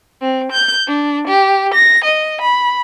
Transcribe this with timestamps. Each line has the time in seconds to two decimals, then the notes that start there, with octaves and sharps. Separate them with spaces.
0.21 C4
0.51 G6
0.86 D4
1.27 G4
1.73 A#6
2.04 D#5
2.41 B5